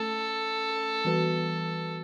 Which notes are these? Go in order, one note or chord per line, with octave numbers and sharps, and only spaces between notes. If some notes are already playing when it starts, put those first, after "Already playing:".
Already playing: A3 C#4 A4
E3 G3 B3 F#4 B4